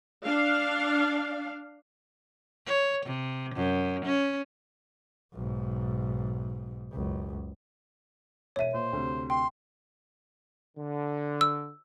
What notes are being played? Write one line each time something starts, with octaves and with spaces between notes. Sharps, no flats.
D4 F5
C#5
C3
F#2
C#4
B1 G#2
F#1 C#2
E1 C#5 E5 D#7
A#2 C5
D2 C3
G5 C6
D3
E6